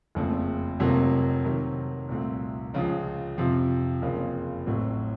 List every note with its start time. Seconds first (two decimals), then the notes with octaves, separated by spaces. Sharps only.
0.15 F#1 F2 C#3 A3
0.79 F1 F2 C3 F#3 A#3
1.44 C3 D#3 F#3
2.09 C2 A#2 A3 C4
2.74 C#2 C#3 F3
3.38 F2 C3 F3
4.02 F#1 F2 C#3 F3 A#3
4.66 A1 A2 F#3 C4